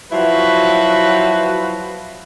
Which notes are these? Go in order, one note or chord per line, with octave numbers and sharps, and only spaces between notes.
F3 F#3 E4 F#4 B4